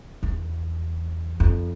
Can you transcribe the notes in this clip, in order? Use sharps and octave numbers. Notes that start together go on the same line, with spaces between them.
E2
F2